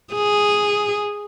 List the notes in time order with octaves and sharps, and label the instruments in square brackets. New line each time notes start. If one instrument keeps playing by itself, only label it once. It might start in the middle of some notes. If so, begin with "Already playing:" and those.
[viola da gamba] G#4